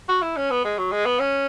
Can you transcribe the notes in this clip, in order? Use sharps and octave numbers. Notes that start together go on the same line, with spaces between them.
F#4
E4
C#4
B3
G#3
F#3
G#3
B3
C#4